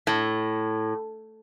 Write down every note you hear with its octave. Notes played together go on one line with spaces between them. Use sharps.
A2